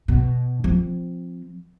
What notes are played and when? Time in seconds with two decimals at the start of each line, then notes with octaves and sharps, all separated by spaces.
0.08 B2
0.64 F3 C4